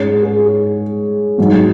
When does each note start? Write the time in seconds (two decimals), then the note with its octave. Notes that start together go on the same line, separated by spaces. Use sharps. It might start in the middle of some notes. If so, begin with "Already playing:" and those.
Already playing: G#2 G#3 C#4 C#5
0.23 G#4
1.38 G#2 F#3 D#4